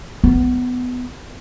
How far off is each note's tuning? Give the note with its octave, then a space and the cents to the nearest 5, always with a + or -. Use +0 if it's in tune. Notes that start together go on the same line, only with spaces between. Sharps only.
B3 +15